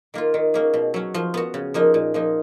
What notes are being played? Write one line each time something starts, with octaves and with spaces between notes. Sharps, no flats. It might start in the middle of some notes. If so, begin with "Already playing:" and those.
D#3 A#3 F4
D#3
A#3 C#4 G#4
B2
F#3 C#4
F3
B3 F#4
C#3
F3 A#3 D#4
A#2
F3 A#3 D#4